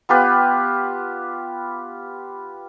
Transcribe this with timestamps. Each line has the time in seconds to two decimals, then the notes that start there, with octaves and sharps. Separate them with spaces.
0.09 B3 F4 G4 B4